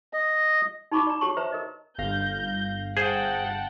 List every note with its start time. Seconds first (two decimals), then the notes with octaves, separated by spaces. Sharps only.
0.13 D#5
0.92 D#4 F#4 A5 B5 C#6 D6
1.07 D5 A#5
1.21 F#4 G4 C#5 A5 C6 C#6
1.37 B4 C5 E5 A#5
1.52 A#4 D#5
1.99 G1 F5 G6 A#6
2.97 G#4 C5 F#5 G5 A5